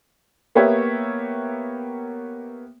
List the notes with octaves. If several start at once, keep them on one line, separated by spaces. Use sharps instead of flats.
A#3 B3 G4 C#5 E5